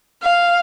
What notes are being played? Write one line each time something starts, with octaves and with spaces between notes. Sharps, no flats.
F5